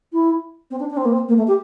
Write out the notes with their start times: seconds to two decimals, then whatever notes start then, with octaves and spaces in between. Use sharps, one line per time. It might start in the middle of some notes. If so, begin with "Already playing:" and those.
0.12 E4
0.70 C4
0.79 D4
0.90 D4
0.97 C4
1.05 A#3
1.12 C4
1.28 A#3
1.37 A3
1.47 G4